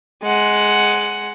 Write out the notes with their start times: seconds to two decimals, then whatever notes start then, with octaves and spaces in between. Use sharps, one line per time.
0.23 G#3 F#5